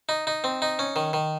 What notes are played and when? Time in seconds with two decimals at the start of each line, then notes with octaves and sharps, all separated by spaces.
0.09 D#4
0.27 D#4
0.44 C4
0.62 D#4
0.79 C#4
0.96 D#3
1.13 D#3